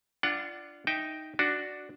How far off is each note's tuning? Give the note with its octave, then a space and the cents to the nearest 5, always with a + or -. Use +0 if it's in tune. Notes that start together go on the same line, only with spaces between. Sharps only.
D4 +0 F4 -20 F#5 +15
D#4 +0 E5 +0 G5 +0
D4 +0 F#4 +0